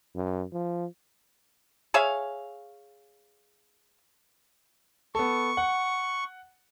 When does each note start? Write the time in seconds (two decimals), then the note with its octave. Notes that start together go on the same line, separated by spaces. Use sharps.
0.15 F#2
0.52 F3
1.94 G#4 C#5 E5 F5
5.15 B3 A4 C#6
5.57 F#5